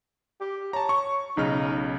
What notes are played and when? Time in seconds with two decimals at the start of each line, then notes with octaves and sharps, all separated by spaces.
0.41 G4
0.73 C#5 A5 A#5
0.89 C#6
1.37 B1 C#3 D#4 F6